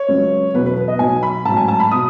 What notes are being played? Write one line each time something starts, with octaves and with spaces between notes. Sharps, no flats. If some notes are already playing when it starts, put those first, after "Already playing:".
Already playing: C#5
C#2 C#3 F#3
E2 B2 F#3 B4
B4
B4
D#5
B1 B2 F#3 G#5
B5
A1 G#2 F#3 A5
G#5
A5
B5
B2 F#3 D#6